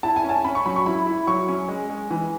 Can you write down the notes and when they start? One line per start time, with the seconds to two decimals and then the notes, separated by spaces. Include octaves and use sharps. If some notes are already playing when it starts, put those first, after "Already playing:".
0.03 E4 A5
0.16 G#5
0.24 C#4
0.29 A5
0.44 C#4 B5
0.55 C#6
0.65 F#3 B5
0.76 C#6
0.86 E4 B5
1.07 E4
1.27 F#3 C#6
1.48 C#4
1.69 G#3
1.90 G#3
2.10 E3